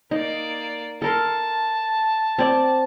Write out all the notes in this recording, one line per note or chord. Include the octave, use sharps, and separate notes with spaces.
A#3 D#4 D5
A4 A#4 A5 C6
C4 D5